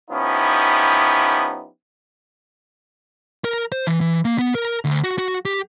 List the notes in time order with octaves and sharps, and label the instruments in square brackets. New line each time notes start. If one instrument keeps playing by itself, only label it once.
[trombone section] F3 B3 C#4 D#4 E4 G4
[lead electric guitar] A#4
C5
E3
E3
A#3
B3
A#4
D2
F#4
F#4
G4